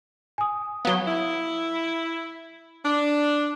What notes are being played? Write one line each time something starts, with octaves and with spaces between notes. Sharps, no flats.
G#5 D#6
F#3 B3 F5 D#6 G7
E4
D4